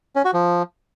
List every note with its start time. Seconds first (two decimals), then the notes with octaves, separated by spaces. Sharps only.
0.16 C#4
0.25 F#4
0.34 F3